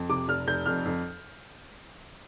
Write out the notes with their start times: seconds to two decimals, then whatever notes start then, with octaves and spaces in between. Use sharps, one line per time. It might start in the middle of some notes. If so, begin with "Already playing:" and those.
Already playing: F2
0.09 C3 D6
0.28 F1 F6
0.47 F1 G6
0.66 F2 F6
0.85 F2